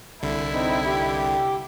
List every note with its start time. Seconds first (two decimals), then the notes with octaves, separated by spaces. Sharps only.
0.22 C2 D3 E4
0.51 C4 D#4
0.85 G4